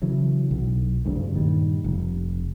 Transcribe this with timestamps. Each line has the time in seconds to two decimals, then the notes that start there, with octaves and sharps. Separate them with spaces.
0.02 C#3 E3 F#3
0.51 B1
1.05 F#1 D2 G2 C#3
1.32 G2 A#2 D#3 G3
1.84 F1